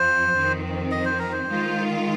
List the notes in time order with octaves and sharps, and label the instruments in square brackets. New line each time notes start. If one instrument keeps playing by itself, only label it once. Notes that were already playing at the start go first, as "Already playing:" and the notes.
Already playing: [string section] F2 F3 C4 [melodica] C5
[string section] F2 D#3 C4
[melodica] D#5
C5
A#4
C5
[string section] D#3 G#3 F4